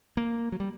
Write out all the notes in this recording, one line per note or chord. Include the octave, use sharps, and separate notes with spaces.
A#3
F#3
G3